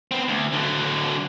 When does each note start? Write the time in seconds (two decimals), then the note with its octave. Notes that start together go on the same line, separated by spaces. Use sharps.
0.11 B3 C4
0.28 D2
0.53 D3 F#3